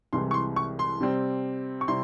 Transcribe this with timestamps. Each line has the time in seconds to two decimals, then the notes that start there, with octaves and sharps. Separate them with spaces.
0.13 C2 C3 E3 G#3 C6
0.31 C#6
0.34 C6
0.56 C#6
0.79 C6
1.01 C3 G3 C4
1.81 C#6
1.88 C3 G3 C4 E4 C6